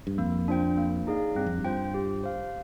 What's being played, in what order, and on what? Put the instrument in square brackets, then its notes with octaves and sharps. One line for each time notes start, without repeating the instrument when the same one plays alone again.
[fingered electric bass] G2
[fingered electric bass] F2 [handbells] A#3
[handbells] D4 F4 C5 G5
A#3
D#4 G#4 D5 F5
[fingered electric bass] G2 [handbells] C4
[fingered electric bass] F2
G2
[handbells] F4 C5 G5
G4
C5 F5